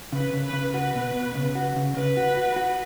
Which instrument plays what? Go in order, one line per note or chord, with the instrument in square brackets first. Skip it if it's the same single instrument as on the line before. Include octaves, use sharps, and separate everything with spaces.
[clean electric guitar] C#3 [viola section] B4
[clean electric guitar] C#3
[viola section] B4
[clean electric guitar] C#3
[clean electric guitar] F#4 [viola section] B4
[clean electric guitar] B2
B2
C#3
F#4
C#3
[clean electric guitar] C#3 [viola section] B4
[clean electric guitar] F#4
F#4
F#4